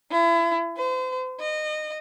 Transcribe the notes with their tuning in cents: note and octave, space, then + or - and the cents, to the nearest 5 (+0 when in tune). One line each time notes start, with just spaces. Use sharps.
E4 +35
C5 -35
D#5 -20